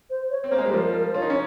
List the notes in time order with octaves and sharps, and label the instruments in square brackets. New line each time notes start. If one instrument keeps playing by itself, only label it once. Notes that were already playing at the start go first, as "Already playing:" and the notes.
[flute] C5
C#5
[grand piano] C4
[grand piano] A#3 [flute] C5
[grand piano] G#3
G3
[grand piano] F3 [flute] A#4
[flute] A#4
[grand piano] F4 [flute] C#5
[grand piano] D#4
C#4